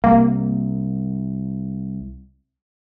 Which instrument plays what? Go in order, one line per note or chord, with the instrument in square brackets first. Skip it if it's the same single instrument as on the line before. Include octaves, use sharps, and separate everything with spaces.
[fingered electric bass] C2 [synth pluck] A#3